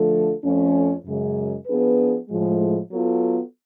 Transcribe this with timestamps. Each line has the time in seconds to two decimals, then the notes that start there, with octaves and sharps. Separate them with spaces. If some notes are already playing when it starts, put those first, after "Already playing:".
Already playing: D3 F3 A3 F4 A4
0.43 F2 F3 A3 C#4
1.06 F#2 C#3 G#3
1.67 F3 B3 D4 G#4 B4
2.29 A2 F3 G#3
2.90 F#3 B3 F4 A4